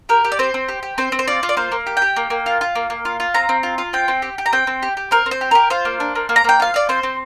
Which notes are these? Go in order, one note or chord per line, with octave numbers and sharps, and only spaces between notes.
G4 A#4
G4
D5
C4 C5
C4
G4
G4
C4 C5
C4
C5
F4 D5
F4
D5
A#3 C5
A#3
G4
G5
G4
A#3
A#3
F4
F4
A#3
A#3
F4
F4
C4 A#5
C4
F4
F4
C4 G5
C4
G4
G4
A#5
C4 G5
C4
G4
G4
C4 A#4
C4
C5
G4
G4 A#4
F4 C5
A#3
D4
A#3
A#3
A#5
A#3 G5
F4 F5
F4 D5
C4 C5
C4